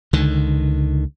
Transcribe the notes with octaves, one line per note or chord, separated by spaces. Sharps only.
C#2 D3 D#3